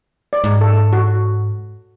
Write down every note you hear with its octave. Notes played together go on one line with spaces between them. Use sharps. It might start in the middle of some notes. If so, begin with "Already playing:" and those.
D5
G#2
A4
F#4